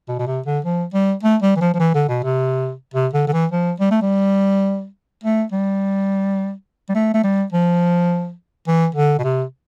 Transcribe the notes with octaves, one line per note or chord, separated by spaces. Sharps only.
B2
B2
C3
D3
F3
G3
A3
G3
E3
F3
F3
E3
D3
B2
C3
C3
D3
D3
E3
F3
G3
A3
G3
A3
G3
G3
A3
A3
G3
F3
E3
D3
B2
C3